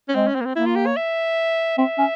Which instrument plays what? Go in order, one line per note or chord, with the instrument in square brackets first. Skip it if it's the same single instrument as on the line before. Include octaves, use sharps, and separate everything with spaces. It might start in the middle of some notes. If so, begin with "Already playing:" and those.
[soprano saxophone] C#4
[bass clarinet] G#3 [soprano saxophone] C4
[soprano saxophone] C#4
C4
A#3
C4
[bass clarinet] A#3 [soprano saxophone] E4
[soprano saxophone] F4
G4
C#5
E5
[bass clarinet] C4 [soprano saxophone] E5
[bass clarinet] C#4